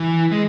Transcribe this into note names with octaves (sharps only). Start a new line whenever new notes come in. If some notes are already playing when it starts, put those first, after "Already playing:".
Already playing: E3
G#3